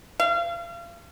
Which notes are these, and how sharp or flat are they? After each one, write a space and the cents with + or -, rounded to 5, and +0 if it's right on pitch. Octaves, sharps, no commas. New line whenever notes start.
F5 -35